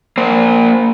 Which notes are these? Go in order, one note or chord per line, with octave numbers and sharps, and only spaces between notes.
A#3 C5